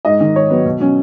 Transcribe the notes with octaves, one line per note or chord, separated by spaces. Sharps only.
G#2 D#5
D#3
G#2 C#5
F#3 B3
B2
F#3 C#4